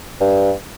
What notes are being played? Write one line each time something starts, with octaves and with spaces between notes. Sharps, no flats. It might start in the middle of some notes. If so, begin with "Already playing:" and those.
G2